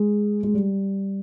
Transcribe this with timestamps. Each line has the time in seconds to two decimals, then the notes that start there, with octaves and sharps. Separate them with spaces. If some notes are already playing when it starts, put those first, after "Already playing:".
Already playing: G#3
0.43 G#3
0.54 G3